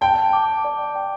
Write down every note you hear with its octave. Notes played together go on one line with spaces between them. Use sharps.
G5 A5
D6
D5
G5